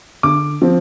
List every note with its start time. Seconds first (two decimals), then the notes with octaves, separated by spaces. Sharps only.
0.23 D3 D6
0.62 F3 C4